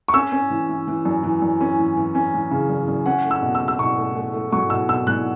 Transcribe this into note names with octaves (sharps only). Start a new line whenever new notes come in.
C#6
C#4 E6
C#4
E3
E3
E3
F#2
E3
F#2
C#4
E3
E3
C#4
E3
C#3
F#2
F#2
C#4 F#5
A3
E6
B2
E6
B2
E6
B2 C#6
A3
A3
A3
F#3 C#6
B2 E6
B2 E6
F#3 F#6